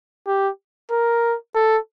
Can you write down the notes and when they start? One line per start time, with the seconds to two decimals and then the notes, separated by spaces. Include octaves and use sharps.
0.27 G4
0.91 A#4
1.55 A4